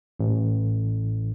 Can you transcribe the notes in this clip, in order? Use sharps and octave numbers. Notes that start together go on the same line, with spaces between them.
A1